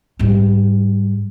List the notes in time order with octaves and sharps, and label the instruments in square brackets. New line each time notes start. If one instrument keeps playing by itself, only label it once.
[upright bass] G#2 G3